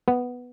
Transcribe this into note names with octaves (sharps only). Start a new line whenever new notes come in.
B3